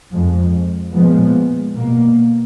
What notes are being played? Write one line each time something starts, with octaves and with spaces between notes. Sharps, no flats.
F2 F3 G#3
A#2 F3 G#3 B3
B2 A#3